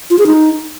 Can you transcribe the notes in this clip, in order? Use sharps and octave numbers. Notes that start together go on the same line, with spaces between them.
F4
G#4
D#4